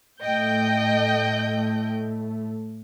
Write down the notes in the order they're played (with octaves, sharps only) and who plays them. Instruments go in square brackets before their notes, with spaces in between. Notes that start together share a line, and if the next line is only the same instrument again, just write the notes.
[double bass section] A2 A3 [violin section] D#5 G5 G6